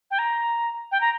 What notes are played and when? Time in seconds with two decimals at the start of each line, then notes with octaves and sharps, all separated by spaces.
0.11 G5
0.19 A#5
0.92 G5
1.01 A#5